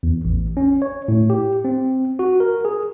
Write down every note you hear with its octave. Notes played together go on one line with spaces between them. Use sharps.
E2
A1
C#4
C#5
A2
G4
C4
F#4
A#4
G#4